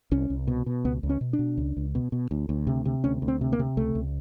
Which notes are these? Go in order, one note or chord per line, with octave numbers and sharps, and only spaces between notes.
C2 C#4
C2
B2
B2
C#2 B3
C#2
C#4
B2
D4
B2
C#2
C#2
B2
B2
D2
D2
C3
C3
D2 C#4
D2
C4
C3
A#3
C3
C#2 A3
C#2